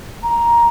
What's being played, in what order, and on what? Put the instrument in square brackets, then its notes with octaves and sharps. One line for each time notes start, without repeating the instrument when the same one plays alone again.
[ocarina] A#5